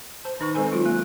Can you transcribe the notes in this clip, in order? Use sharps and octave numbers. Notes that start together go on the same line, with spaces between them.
C5 A5
D#3 D#4 B4 C#6
G#3 C4 A4 C5 G#5
F#3 F4 F#4
A#3